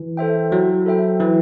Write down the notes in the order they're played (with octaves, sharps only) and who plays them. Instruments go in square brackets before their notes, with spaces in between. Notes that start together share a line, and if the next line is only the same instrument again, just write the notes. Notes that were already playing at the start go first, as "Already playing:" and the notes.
Already playing: [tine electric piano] E3
[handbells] A4 C5 E5 G5
[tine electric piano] F#3 [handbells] E4
[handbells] A4 C5 E5 G5
[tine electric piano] E3 [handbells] E4